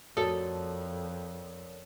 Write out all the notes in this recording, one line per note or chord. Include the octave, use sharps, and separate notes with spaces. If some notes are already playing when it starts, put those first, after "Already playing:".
F2 F#4 A4 A#4 C#5 D5